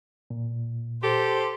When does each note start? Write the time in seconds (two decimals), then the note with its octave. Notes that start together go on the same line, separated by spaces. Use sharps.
0.30 A#2
1.03 G4 A4 C5